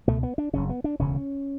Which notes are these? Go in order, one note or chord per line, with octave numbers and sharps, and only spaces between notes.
C#2 B2 A3
B3
D4
F#1 F#2 C#3 C#4
B3
D4
E1 D2 C#3 C#4